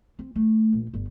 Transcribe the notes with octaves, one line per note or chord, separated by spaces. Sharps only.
C4
A3
A#1
G1